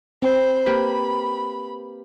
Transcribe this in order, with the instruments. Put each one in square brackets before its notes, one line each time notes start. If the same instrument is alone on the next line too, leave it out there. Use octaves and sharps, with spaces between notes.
[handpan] C4 [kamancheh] C5 B5
[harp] A#3 G4 B4 [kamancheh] B5